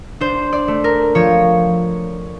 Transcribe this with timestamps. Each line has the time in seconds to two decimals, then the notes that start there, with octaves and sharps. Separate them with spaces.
0.20 D4 C5
0.53 D5
0.68 A3
0.84 A#4
1.15 F3 C#5